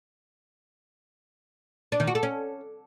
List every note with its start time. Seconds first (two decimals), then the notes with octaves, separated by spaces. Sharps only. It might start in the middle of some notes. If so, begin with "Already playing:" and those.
1.92 D4
2.00 D#3
2.07 F#4
2.15 A4
2.23 C#4